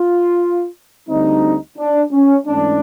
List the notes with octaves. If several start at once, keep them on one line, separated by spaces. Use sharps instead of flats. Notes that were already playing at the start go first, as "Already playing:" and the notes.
Already playing: F4
D2 D3 G3 C4 D#4
D4
C#4
G#2 E3 A3 C#4 D4